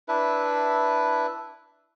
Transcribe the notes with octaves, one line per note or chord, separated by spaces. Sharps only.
D4 E4 B4 E5